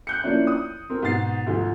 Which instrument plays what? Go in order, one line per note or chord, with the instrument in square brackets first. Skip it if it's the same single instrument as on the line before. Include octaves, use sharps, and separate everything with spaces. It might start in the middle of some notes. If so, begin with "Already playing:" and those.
[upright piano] F#6 G6 C#7
F3 A#3 C#4 D4 E4
D#6
C4 A#4
G#2 B2 A6 C7
D2 G#2 D#3 F3